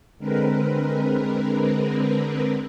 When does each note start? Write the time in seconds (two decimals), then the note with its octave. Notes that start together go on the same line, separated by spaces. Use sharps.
0.18 D3 G#3 C4 A#4 B4